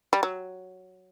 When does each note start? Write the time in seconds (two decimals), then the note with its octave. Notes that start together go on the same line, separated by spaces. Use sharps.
0.13 G3
0.23 F#3